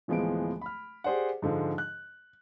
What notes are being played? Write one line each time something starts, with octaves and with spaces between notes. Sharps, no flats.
D1 E3 F3 G#3 B3 D7
B5 F6
G4 G#4 C5 D5 F#5
G#2 D3 F3 G#3
F#6